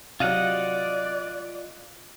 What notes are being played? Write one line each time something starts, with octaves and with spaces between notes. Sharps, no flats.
C3 F#3 F4 D5 D#5 F5 F#5